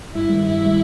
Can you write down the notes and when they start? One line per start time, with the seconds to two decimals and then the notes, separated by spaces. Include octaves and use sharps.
0.14 G2 E4
0.30 D#3 G3
0.45 G2 E4
0.62 D#3 G3